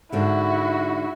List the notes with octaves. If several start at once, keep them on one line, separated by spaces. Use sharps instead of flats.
G#2 D3 A#3 E4 F#4